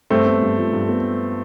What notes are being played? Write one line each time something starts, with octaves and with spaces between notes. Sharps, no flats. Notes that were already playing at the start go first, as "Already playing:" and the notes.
G2 A3 C4
B3
G2
F3
G2
B3